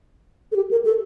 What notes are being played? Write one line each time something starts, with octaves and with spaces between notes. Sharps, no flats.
A4
G4
A#4
A4